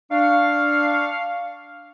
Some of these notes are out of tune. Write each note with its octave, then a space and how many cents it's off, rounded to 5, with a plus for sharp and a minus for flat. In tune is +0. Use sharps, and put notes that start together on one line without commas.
D4 +0 F5 +0 C#6 +0